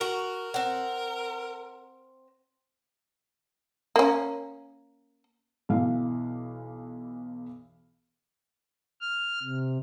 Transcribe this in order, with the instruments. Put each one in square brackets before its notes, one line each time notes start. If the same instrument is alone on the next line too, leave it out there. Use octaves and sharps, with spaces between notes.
[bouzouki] F#4 [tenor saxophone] A#4
[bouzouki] C4 F#5
[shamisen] A#3 C#4
[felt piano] B1 B2 E3 E4 F5
[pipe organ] F6
C3